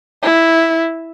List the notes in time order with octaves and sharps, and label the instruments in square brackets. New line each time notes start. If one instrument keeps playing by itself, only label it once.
[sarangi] E4